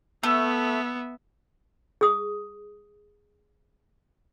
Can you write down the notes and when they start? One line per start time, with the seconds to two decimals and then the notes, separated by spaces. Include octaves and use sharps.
0.23 A3 B3 E5
2.01 G#4 D#6